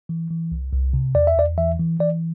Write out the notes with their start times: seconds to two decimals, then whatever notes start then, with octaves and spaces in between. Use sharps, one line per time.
0.09 E3
0.31 E3
0.52 C2
0.73 C2
0.94 C3
1.15 E2 D5
1.27 E5
1.37 E2 D5
1.58 E3 E5
1.79 E3
2.00 E3 D5